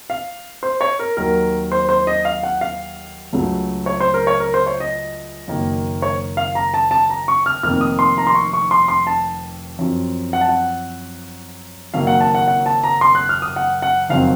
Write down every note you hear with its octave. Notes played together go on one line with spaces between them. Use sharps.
F5
C5
C#5
A#4
D#2 D#3 F#3 A#4
C5
C5
D#5
F5
F#5
F5
C#2 C#3 F#3 A3
C#5
C5
A#4
C#5
A#4
C5
C#5
D#5
F#1 F#2 D#3 A#3
C#5
F5
A#5
A5
A5
A#5
C#6
F6
F1 F2 D#3 A#3 F6
D#6
C6
A#5
C6
C#6
C#6
C6
C6
A5
F#2 F3 C4
F#5
A5
F#5
F#1 F#2 D#3 F#3 A#3 F5
F#5
A5
F#5
F#5
A5
A#5
C6
F#6
F6
D#6
F#5
F#5
F#1 F2 D#3 F#3 C4 F5